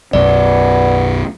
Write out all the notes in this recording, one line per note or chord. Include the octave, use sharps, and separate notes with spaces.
B1 F#2 B2 B3 D5